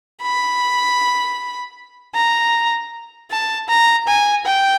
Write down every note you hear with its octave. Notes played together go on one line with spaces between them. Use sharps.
B5
A#5
A5
A#5
G#5
G5